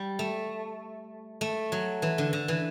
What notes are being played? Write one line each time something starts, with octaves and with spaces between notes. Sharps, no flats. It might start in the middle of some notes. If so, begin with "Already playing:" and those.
Already playing: G3
A3
A3
F#3
E3
D3
D3
E3